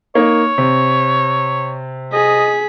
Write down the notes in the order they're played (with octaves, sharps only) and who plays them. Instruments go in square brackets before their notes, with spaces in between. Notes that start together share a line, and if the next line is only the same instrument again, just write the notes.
[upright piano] A#3 D#4 [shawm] C#5
[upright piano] C3
[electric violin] G#4 B6 [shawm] D#5